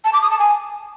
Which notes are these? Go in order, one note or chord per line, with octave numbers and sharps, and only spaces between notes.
A5
D6
D#6
A5
G#5